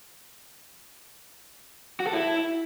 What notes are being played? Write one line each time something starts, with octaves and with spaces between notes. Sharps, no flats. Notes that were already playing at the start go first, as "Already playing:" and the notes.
F#4
A4
E4